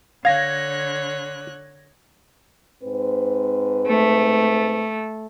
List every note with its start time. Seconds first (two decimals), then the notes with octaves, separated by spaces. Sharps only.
0.25 D3 C#5 F5 F#6 G#6 A#6
2.83 G#2 C4 B4
3.88 A3